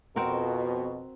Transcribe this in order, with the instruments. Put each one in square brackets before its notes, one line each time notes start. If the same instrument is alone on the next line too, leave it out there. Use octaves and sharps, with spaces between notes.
[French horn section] F2 B2 [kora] C4 F#4 A#4